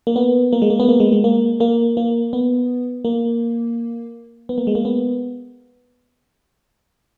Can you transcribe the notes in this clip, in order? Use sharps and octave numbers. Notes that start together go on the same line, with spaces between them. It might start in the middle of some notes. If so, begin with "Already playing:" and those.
A#3
B3
A#3
G#3
A#3
B3
A#3
G#3
G#3
A#3
A#3
A#3
B3
A#3
B3
A#3
G#3
A#3
B3